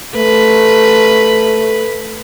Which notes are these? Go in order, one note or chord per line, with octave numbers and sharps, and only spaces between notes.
A3 B4